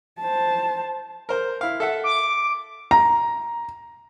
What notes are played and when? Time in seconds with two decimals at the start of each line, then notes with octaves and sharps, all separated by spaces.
0.20 C5 A5
1.29 A#4 C5 A#5
1.61 E4 F5
1.80 A4 E5 F#5
2.04 D6
2.91 A#5